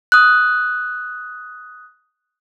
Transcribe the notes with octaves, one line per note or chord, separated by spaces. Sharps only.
D#6 F#6